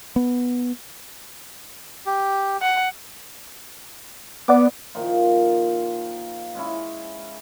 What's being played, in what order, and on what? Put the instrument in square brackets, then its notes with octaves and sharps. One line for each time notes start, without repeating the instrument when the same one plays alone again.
[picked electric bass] B3
[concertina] G4
[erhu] F#5
[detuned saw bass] B3 [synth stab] D5 F#5 D6
[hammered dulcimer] A#2 D#3 F3 F4
G#3 C#4 E4